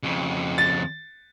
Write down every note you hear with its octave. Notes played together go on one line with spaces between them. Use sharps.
F2 C#3
A6